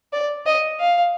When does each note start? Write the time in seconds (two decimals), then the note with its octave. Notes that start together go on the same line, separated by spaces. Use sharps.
0.13 D5
0.46 D#5
0.80 F5